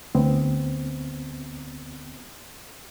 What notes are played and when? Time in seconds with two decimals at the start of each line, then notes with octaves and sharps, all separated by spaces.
0.15 D2 B3 C4